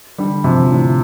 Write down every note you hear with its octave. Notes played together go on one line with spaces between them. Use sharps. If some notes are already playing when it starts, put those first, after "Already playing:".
D3 G3
C3 F3
F3
A2 D3